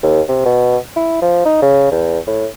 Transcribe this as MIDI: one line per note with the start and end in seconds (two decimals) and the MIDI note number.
0.03 0.21 39
0.29 0.42 48
0.45 0.77 47
0.96 1.17 64
1.22 1.45 53
1.46 1.60 63
1.62 1.87 49
1.92 2.19 40
2.27 2.47 45